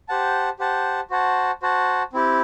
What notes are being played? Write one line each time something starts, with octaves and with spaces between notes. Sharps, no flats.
G4 C5 F#5 A5
G4 C5 F#5 A5
F#4 C5 F#5 A5
F#4 C5 F#5 A5
C4 E4 G4